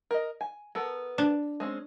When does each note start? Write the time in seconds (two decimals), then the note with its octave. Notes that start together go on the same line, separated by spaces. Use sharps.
0.11 A#4 D#5
0.41 G#5
0.75 B3 A4 A#4
1.18 D4
1.60 G#3 C4 C#4